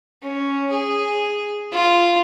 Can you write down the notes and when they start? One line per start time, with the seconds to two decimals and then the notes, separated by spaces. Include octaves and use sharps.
0.23 C#4
0.71 G#4
1.72 F4